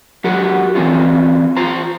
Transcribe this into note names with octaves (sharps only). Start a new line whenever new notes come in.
F#3 F#4 G4 A#4
E3 F3 C4 C#4 F4
F4 C5 A#5